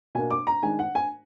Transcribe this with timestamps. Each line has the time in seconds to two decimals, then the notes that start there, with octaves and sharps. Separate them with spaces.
0.15 B2 A#3 D4 G#5
0.31 D6
0.47 A#5
0.63 D#3 G#3 D4 G#5
0.79 F#5
0.95 G#5